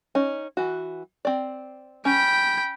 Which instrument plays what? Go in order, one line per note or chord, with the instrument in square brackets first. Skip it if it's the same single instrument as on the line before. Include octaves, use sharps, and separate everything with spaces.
[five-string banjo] C#4 D#4
E3 F#4
C4 D5
[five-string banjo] C#4 [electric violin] G5 B5